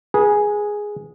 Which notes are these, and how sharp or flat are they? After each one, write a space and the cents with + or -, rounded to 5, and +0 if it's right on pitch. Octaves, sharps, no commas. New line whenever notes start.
G#4 +0 B4 -40